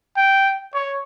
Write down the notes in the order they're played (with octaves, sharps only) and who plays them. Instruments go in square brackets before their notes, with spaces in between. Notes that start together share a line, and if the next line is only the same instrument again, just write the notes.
[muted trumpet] G5
C#5